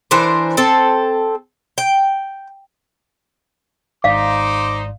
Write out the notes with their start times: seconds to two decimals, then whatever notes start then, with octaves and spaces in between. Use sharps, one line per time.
0.11 E3 D4 A#4 C5
0.57 C4 A4
1.78 G5
4.04 G#1 G#2 D#4 C5 D5 F5 D6